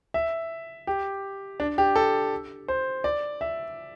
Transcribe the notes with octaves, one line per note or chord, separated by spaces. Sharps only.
E5
G4
D4
G4
A4
C5
D5
E5